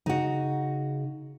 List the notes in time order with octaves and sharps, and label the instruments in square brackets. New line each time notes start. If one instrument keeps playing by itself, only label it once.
[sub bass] C#3 [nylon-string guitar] D#4 F#4